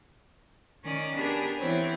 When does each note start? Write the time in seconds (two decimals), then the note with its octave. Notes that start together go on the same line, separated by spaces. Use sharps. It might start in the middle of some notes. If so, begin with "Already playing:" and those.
0.84 D#3 C#4 D5 D#6
1.15 B3 D4 G4 G#4 A#4
1.57 E3 B3 C4 C5 C#5